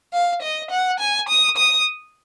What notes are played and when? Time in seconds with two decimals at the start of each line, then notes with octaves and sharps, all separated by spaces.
0.13 F5
0.42 D#5
0.71 F#5
1.00 G#5
1.29 D#6
1.57 D#6